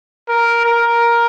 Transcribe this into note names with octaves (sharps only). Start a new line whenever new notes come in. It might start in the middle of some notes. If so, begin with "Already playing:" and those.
A#4
A#4